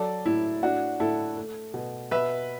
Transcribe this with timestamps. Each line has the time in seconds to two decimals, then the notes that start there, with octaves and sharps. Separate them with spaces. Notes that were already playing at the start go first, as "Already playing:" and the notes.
Already playing: F#3 A4 D5
0.26 A2 E4
0.63 A2 D4 F#4
1.00 A2 E4 A4
1.37 A3
1.74 B2
2.11 B2 B4 E5